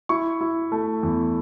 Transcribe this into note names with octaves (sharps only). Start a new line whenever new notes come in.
E4 C#6
E4
A3
E2